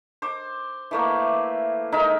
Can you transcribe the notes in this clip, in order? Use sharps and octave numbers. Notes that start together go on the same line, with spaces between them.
C5 D6
E3 A3 A#3
G#3 D#4 A#4 E5